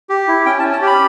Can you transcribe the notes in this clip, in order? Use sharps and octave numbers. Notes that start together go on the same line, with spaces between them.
G4
E4
C#4 G5
A5
C#4
A5
G4 B5